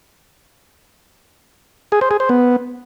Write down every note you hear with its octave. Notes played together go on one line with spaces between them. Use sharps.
G#4
C5
G#4
C5
B3